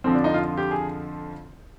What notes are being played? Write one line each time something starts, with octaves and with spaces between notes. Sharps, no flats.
F2 D3 F3 C4
D4
D#4
F4
F4
G4
G#4